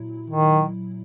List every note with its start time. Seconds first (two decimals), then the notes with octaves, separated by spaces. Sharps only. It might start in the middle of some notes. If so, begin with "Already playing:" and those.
Already playing: A#2 F#3 E4
0.30 D#3